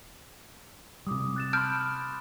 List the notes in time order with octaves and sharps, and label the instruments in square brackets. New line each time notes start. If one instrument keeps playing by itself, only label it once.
[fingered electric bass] C3 G3 [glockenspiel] D6 D#6
[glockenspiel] F#6 A6 E7
[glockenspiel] A5 B5 C6 [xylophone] F6 G6 D7